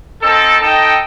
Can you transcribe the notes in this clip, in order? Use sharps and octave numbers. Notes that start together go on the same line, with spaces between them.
C4 D#4 A4
D#4 A4 D#5 G5